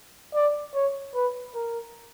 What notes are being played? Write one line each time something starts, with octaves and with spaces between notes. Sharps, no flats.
D5
C#5
B4
A#4